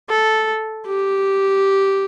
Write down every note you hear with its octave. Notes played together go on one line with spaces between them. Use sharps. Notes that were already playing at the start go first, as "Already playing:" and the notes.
A4
G4